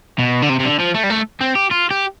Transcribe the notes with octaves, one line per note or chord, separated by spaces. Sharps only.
B2
D3
C3
C3
D3
F3
A3
G3
A3
C4
G4
F4
G4